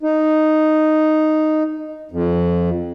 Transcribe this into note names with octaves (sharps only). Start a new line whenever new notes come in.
D#4
F2